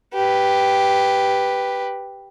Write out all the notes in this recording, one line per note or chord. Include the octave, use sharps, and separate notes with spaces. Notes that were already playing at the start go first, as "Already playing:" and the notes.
G4 B4